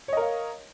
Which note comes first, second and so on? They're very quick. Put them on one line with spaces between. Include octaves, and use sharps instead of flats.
C#5 D#5 A#4 F5